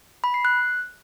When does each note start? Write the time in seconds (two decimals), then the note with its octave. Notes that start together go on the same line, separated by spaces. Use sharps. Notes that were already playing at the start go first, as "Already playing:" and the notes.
0.24 B5
0.34 C7
0.45 F#6